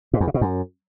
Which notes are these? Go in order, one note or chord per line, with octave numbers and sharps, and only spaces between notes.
G#2
E2
C#3
B2
F#2